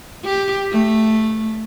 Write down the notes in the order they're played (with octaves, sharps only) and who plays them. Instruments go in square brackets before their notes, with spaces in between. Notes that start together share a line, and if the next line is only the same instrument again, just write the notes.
[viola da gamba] G4
A3